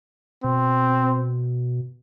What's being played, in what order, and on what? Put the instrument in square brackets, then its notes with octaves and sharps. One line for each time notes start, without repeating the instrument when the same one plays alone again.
[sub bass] B2 [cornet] C4